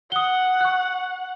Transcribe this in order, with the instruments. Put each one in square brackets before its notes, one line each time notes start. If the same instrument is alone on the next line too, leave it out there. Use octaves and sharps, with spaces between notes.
[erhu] F#5 [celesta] D#6 G7
[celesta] C#6 F#6